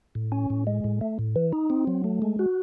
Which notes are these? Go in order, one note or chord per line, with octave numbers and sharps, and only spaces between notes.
A2
C#4
A2
G#3
A2
A3
A2
E3
D#4
C4
F#3
A3
G#3
F#4